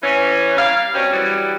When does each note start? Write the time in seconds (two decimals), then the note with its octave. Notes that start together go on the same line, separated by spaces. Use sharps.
0.03 E3 C#4
0.57 G3 A#3 F5
0.94 B2 G3 C4 C#4
1.13 E3 F#3 G3